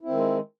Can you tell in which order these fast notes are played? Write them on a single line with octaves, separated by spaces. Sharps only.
E4 C4 D#3 G#3